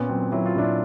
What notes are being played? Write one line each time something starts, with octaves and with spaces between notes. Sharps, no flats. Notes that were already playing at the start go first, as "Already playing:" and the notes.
Already playing: A#2 B3 C#4
F#3 C4
F#3 E4
F4
A#2 D4 E4